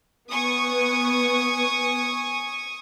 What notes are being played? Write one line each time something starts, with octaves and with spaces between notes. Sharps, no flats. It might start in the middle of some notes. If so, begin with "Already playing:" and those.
B3 G#5 C#6 D#6